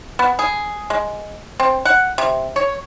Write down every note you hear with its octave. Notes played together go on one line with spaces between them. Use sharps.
B3
G#4
G#3
C4
F#5
C3
C#5